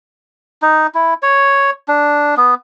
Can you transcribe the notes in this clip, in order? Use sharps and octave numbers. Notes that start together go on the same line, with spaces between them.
D#4
E4
C#5
D4
B3